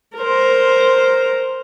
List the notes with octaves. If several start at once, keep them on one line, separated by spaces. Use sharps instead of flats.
A#4 C5